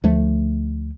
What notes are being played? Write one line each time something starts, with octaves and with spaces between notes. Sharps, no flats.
D2 F3 A3